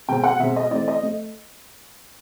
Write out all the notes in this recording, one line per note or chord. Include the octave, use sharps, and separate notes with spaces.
B2 G#3 C4 G5
F#5
B2 G#3 C4 E5
D#5
E3 A3 C4 D5
D#5
A3